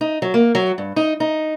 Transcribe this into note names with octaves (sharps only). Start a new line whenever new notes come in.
D#4
F#3
A#3
F#3
G2
D#4
D#4